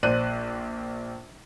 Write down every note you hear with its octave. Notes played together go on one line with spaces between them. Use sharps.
A#1 C5 D5 F#6 D#7